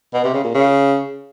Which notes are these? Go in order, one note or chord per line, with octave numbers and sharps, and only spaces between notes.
B2
C3
C#3
A#2
C#3